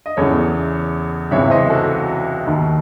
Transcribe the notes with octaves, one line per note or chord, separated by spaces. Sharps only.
D#5
E2 C#3 E3 A4 C#5
C#2 C3 E3 C#5 E5
C5 D#5
F#4 A4
D#2 D#3